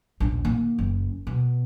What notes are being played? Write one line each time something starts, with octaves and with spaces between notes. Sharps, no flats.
A#1 D#2
D#3 A#3
F#1
B2